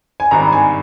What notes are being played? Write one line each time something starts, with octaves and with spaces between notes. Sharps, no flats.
G#5
G#1 G2 D#3 A#5
G#5